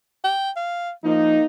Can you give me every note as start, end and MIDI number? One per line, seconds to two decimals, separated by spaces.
0.24 0.51 79
0.56 0.92 77
1.04 1.39 53
1.04 1.45 58
1.04 1.45 63